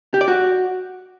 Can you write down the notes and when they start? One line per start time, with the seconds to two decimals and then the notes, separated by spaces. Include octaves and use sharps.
0.14 G4
0.21 D5
0.28 F#4